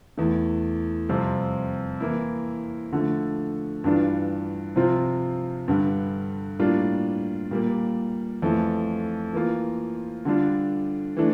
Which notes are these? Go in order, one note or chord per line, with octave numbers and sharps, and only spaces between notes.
E2 E3 A3
F2 C3 G3 C4
E3 A#3 E4
D3 F3 A3
G2 E3 G3 D4 F4
C3 F3 C4 F4
G2 D3 G3
A2 G3 A#3 D4 F4
A#2 G3 A#3
F2 E3 A3
E3 A#3 F4
D3 G3 D4 F4
E3 A3 D4